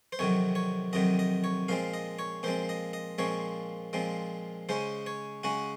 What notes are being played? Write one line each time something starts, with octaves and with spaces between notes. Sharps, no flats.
C5
F2 C3 D#3 F#3 C#5
C#5
F2 C3 D#3 F#3 D#5
D#5
C#5
A#2 F3 G#3 C4 F5
D#5
C#5
A#2 F3 G#3 C4 C5
D#5
D#5
A#2 F3 G#3 C4 C#5
A#2 F3 G#3 C4
C#3 G#3 C#4 C5
C#5
C#3 G#3 C#4 F#4